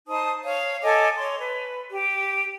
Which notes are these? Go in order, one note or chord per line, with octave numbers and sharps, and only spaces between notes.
D#4 C5 A5 D#6
C#5 F5
A4 D#5 G#5 D6
C#5 C6
B4
G4